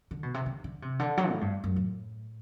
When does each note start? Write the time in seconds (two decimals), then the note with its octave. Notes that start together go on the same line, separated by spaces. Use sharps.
0.11 D3
0.23 B2
0.34 C3
0.46 D3
0.64 D3
0.82 C3
0.99 D3
1.18 F#3
1.29 A2
1.41 G2
1.64 F#2
1.76 A2